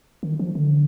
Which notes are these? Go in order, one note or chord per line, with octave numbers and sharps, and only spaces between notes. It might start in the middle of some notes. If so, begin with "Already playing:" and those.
D#3
F3
D3